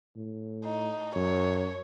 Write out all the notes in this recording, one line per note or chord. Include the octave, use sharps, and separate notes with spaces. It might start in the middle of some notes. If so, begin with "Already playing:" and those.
A2
D#4
F#2 C#5